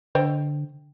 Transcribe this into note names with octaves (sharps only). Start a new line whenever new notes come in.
D3 C5 D#5 G5